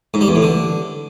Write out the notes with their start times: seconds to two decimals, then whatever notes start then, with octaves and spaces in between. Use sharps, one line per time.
0.14 G#2
0.21 G3
0.28 E2
0.35 A2
0.42 D3